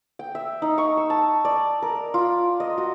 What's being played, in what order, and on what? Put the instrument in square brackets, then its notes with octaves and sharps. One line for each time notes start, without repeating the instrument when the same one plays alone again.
[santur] G5
E5
D#4
C#6
E6
A5
D5
A#4
F4
D#5
F#4